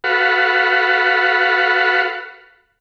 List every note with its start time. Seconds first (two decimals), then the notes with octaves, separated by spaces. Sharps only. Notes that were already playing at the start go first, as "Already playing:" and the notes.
0.04 F#4 A4 B4 F5 F#5 B5